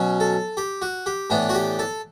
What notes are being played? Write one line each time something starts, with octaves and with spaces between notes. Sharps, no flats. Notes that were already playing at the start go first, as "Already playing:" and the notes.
Already playing: B2 F#3 C#4
A4
G4
F#4
G4
A2 E3 B3 D4
F#4
G4
A4